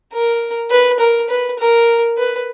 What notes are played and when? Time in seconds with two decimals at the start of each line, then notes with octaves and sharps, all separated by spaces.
0.13 A#4
0.70 B4
0.99 A#4
1.29 B4
1.59 A#4
2.17 B4